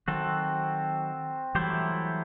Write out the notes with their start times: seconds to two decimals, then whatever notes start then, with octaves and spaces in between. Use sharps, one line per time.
0.07 D#3 F#3 C4 F#4 A4
1.55 E3 F#3 G3 A3 E4 G4 C5